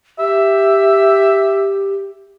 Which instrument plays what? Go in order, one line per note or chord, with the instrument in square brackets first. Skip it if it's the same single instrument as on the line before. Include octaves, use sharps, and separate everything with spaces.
[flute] G4 [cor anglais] E5